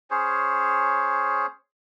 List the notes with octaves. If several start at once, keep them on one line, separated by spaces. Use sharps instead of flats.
C#4 G#4 C5 C#5